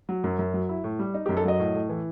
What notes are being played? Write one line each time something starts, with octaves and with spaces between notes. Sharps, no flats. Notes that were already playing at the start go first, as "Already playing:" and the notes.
F#3
F#2
F#2
F#3
E4
A2
G3
D#4
G4
F#2
A4
F#3 D#5
A2
A2
E3